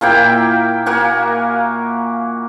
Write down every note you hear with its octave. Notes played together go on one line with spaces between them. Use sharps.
A#2 A#3 E4 G5
A#3 F#4 G#5